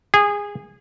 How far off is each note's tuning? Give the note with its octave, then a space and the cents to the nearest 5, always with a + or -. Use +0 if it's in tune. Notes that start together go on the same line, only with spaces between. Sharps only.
G#4 -20